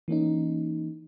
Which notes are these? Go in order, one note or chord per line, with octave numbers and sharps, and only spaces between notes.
E3 A#3 C#4 D#4